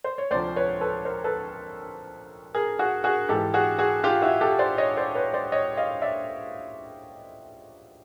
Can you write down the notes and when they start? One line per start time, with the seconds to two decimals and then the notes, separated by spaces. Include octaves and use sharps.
0.04 C5
0.18 C#5
0.31 D2 C3 F3 C5 D5
0.56 B4 C#5
0.81 A4 B4
1.05 A#4 C5
1.24 A4 B4
2.55 G#4 A#4
2.79 F#4 G#4
3.04 F#4 G#4
3.29 G#2 E3 G4 A4
3.54 F#4 G#4
3.78 F#4 G#4
4.04 F4 G4
4.22 E4 F#4
4.41 G4 A4
4.59 C5 D5
4.78 C#5 D#5
4.97 C5 D5
5.15 B4 C#5
5.34 C5 D5
5.52 C#5 D#5
5.77 D#5 F5
6.02 D5 E5